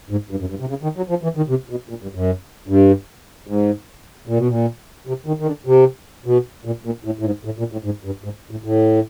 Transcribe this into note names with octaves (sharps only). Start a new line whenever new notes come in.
G#2
G2
F#2
G2
C3
C#3
D#3
F#3
F3
E3
D#3
C3
B2
A#2
G2
F#2
G2
G#2
A#2
B2
A#2
C3
D#3
D#3
D3
C3
B2
A#2
A#2
A2
A2
G#2
A2
A#2
A2
G#2
G2
G#2
A2
A2